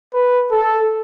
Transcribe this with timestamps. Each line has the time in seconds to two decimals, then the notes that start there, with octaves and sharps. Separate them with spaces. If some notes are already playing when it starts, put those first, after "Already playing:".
0.14 B4
0.52 A4